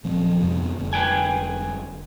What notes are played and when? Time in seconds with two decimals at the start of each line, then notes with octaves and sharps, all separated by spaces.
0.04 D#1 F3 C4
0.40 F2 C3 B3
0.79 F1 D3
0.93 B4 G5 G#5